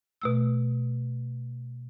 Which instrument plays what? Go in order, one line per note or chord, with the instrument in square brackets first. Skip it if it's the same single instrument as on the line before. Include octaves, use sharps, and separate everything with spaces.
[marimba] B2 A3 E6